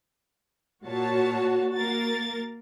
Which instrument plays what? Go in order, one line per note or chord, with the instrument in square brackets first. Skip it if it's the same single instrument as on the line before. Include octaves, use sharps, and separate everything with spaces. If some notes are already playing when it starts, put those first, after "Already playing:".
[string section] A#2 C#5 A5 [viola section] F#4
[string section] A#3 A#4 A6